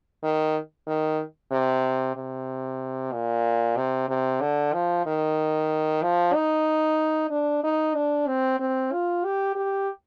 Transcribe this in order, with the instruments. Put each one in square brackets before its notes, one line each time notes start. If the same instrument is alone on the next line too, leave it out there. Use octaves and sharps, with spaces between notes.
[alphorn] D#3
D#3
C3
C3
A#2
C3
C3
D3
F3
D#3
F3
D#4
D4
D#4
D4
C4
C4
F4
G4
G4